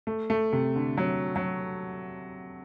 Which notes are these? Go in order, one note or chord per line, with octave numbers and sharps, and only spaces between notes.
A3
A3
C3
D3
F#3
F#3